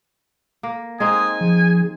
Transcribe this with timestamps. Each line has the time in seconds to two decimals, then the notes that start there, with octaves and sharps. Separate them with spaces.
0.63 A#3
1.00 G#3 C4 D#4 G#5 D#6
1.41 F3 G#4